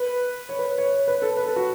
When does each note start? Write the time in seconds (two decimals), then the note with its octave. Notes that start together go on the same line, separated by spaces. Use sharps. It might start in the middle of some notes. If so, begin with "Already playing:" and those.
Already playing: B4
0.49 C#5
0.59 B4
0.78 C#5
1.08 B4
1.22 A4
1.37 B4
1.46 A4
1.56 F#4